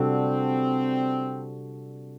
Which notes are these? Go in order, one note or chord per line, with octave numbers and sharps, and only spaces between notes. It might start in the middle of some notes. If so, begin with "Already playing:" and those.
Already playing: C3 G3 C4 D4 F#4 A4